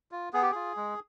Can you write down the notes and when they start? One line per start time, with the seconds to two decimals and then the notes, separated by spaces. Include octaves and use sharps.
0.12 F4
0.33 B3 G#4
0.42 G4
0.51 F4 G#4
0.77 G#3